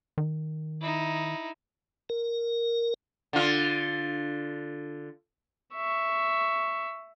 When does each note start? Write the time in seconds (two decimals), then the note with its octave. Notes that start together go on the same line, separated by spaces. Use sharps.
0.18 D#3
0.81 D#4 E4
2.09 A#4
3.33 D3 F4
5.74 E5 C#6